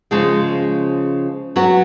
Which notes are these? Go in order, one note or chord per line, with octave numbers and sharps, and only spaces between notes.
C#3 F3 G#3
F#3 B3 F#4